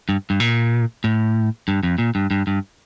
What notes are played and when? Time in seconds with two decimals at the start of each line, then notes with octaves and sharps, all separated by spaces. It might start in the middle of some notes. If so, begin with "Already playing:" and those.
0.09 G2
0.30 G2
0.40 A#2
1.04 A2
1.68 G2
1.83 F2
1.98 A#2
2.15 G2
2.31 G2
2.47 G2